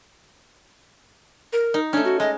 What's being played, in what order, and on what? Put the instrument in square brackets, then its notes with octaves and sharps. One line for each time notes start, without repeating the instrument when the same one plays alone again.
[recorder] A#4
[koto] D#4
[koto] A3 C#4 [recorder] D4
[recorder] F#4
[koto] G#3 [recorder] D#5